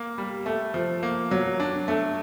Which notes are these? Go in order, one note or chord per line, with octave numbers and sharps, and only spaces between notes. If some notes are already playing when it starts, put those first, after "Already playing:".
Already playing: A#3
G3
A3
F3
A#3
F#3
D4
A3